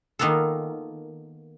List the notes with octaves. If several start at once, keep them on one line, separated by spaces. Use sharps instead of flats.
D#3 A#3 B3 F4 A4